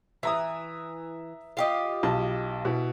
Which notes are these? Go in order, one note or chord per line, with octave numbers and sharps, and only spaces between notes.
E3 E5 A#5 D#6
F4 G4 D#5
B1 A5
B2 E4